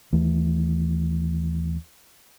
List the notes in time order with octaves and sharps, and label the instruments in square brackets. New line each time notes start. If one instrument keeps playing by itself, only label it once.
[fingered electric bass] D#2 E3 A3